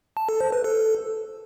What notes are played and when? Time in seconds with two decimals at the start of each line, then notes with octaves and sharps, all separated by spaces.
0.17 A5
0.29 A4
0.41 C5
0.52 B4
0.64 A4